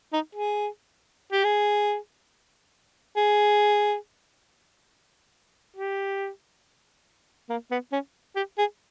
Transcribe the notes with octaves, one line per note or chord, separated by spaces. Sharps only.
D#4
G#4
G4
G#4
G#4
G4
A#3
B3
C#4
G4
G#4